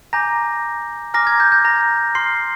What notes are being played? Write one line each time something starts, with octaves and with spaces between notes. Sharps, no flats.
G#5 A#5 D6 G6 A#6
G#5 A#5 D6 F6 A#6
G#6
G6
G6
A#5 A#6
C6 F6 C7